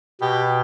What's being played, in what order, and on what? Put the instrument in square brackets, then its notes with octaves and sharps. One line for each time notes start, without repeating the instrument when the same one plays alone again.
[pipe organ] B2 [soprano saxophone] G4